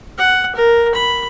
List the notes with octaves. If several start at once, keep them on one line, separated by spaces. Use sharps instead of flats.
F#5
A#4
B5